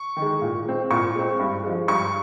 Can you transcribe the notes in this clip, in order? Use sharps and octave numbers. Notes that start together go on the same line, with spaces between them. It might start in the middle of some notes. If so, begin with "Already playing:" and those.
Already playing: C#6
D#3
G#3
A#2
G#3 C4
A#2 C#6
G#3 C4
G2
F3 G#3
G2 C#6